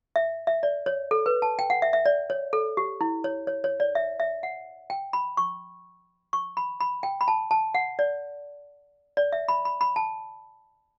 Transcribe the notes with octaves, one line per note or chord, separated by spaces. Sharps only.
E5
E5
D5
C#5
A4
B4
A5
G5
F#5
E5
E5
D5
C#5
A4
G4
E4
C#5
C#5
C#5
D5
E5
E5
F#5
G5
B5
C#6
C#6
B5
B5
G5
B5
A5
A5
F#5
D5
D5
E5
B5
B5
B5
A5